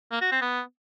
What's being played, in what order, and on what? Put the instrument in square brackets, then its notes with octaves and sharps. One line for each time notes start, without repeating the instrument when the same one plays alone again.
[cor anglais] A#3
F#4
C4
B3